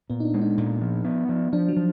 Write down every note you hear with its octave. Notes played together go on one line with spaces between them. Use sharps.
A#2 B3
D#4
D4
G#3
D#4
A#2
F3
B3
F3
F3 D4
F#3
F3